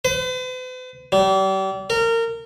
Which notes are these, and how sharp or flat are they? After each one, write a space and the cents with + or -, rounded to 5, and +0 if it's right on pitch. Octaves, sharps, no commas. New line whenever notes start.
B4 +45
G3 -35
A#4 -25